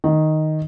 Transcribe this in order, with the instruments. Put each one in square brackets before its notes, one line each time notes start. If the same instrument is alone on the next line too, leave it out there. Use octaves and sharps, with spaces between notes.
[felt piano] D#3